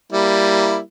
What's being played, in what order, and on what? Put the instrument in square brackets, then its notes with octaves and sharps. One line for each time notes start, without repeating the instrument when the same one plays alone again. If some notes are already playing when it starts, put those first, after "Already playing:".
[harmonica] G3 A#3 E4